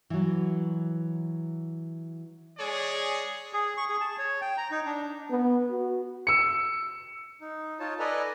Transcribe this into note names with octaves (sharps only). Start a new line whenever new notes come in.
E3 F#3
G#3 G#4 C#5 D5
G#4
C#6
G#4
A5
C#5
G5
A#5
D#4
D4
B3
F#4
E6 C#7
D#4
D#4 F4 C#5 A5
A4 B4 D5 D#5 G#5 A#5